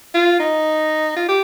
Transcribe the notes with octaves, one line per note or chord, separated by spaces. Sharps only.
F4
D#4
F4
G4